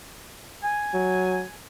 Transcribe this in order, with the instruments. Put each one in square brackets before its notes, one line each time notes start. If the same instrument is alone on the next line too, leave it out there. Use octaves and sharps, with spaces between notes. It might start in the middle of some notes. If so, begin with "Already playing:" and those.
[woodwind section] G#5
[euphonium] F#3